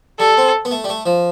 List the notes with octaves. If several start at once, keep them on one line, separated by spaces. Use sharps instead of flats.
G3 A4
C4
B3
A3
G3
A3
F3